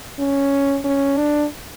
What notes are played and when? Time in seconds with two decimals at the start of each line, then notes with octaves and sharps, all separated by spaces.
0.19 C#4
0.85 C#4
1.17 D4